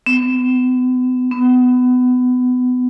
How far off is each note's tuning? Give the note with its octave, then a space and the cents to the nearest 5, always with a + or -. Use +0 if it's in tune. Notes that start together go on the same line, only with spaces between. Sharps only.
B3 +40
B3 +25